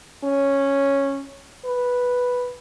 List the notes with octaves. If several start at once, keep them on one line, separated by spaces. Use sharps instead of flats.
C#4
B4